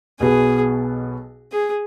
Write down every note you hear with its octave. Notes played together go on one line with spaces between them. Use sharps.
B1 B2 B3 F#4 G#4
G#4